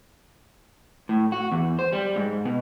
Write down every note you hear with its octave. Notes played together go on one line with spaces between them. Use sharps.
A2
F#4
E2
C5
G3
G#2
B2